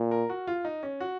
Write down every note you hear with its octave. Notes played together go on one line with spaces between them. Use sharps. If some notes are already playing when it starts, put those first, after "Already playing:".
Already playing: A#2
A#4
F#4
F4
D#4
C#4
F#4